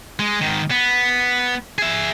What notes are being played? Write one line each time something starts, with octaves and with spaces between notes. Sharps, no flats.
G#3
G#2 D#3
B3
G#4 E5